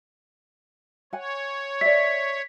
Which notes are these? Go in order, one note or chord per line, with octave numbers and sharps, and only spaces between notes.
C#5 F#5 G#5
D5 E5 B6